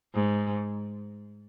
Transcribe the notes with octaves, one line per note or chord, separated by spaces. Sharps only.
G#2